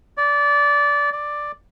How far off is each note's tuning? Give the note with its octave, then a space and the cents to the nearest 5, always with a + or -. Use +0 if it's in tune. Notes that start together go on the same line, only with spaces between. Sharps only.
D5 -20
D5 +5